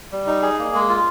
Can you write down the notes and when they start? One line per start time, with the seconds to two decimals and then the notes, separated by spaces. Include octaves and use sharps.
0.12 G3
0.27 D#4
0.42 G#4
0.59 A#3
0.74 G#3
0.89 F4